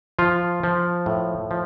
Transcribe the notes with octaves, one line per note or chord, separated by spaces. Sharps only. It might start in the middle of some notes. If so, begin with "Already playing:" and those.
F3 F4
F3
A2
F3